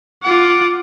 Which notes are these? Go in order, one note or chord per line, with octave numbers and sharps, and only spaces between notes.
F4 F#5 D6